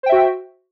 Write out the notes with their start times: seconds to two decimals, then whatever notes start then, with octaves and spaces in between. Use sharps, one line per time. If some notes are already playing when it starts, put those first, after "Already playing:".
0.03 C5
0.06 G5
0.09 E5
0.12 F#4